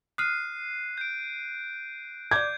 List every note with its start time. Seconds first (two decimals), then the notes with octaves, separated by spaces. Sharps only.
0.18 D#6 F6 F#6 C7 D#7
0.98 G6 D7
2.31 D5 D6 G6 G#6